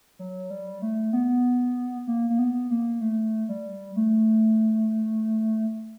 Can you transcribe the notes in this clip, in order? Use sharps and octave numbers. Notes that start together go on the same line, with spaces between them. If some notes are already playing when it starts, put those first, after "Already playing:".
F#3
G3
A3
B3
A#3
A#3
B3
A#3
A3
G3
A3